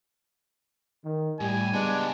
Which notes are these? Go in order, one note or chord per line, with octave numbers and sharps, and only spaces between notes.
D#3
A2 G3 G#5
C#2 G#3 B3 D4